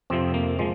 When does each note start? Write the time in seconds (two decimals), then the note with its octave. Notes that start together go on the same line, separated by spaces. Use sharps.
0.10 F2 C3 F3 C4
0.34 A#3
0.59 F3 G#3